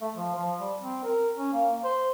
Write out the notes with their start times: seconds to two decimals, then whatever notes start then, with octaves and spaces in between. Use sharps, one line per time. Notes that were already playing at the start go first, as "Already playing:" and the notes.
0.01 A3
0.14 F3
0.35 F3
0.60 G3
0.81 C4
1.04 A#4
1.36 C#4
1.53 A#3
1.84 C5